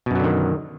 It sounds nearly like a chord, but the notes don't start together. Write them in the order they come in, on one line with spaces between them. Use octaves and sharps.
B2 F#2 F#3 D3 D#3